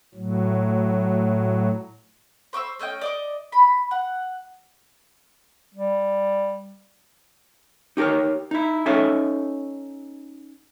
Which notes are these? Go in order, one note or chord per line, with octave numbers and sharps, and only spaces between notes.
A2 F#3
C5 C#6 D6 E6
A3 C#4 D#5 G5
D5 D#5 D6
B5
F#5
G3
D#4 G4 A4 A#4 C#5
D#4 E4
C#4 D#4 A4 C#5 D#5 E5